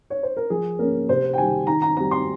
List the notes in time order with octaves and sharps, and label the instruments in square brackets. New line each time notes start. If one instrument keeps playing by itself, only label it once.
[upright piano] C#5
C5
A#4
F3 G#4
A#3 C#4 A#4
C3 C5
G5
D#3 G3 G#5
D#3 A#5
A#5
G3 C4 A#5
C6